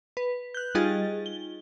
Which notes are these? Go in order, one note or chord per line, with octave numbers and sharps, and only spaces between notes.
B4
F#6 G6
G3 D#4 F4 G#4 D#5 A6
G7